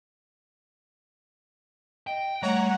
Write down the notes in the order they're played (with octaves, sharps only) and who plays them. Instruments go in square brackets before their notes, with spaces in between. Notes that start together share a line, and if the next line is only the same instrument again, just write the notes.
[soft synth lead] D#5 [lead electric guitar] G5
[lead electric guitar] G3 [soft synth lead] A3 [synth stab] C#5 A#5 [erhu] F#5